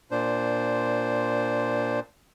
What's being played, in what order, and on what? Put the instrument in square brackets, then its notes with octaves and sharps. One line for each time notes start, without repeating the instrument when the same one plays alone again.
[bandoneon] A#2 D4 C5